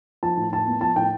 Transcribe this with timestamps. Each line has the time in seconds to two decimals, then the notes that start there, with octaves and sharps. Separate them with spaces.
0.23 F3 A5
0.37 A2
0.52 A2 A5
0.67 B3
0.81 F3 A5
0.96 A2 G5